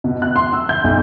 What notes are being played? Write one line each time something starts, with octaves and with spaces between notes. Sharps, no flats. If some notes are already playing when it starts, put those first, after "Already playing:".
B2
F#6
C6
E6
G6
B1